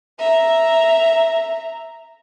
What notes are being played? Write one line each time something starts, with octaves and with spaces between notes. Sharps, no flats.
E5 A#5